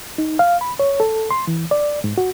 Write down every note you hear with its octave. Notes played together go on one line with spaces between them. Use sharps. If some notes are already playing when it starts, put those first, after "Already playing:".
D#4
F5
B5
C#5
A4
C6
E3
D5
G#2
F#4